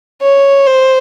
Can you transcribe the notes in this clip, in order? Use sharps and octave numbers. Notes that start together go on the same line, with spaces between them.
C#5
C5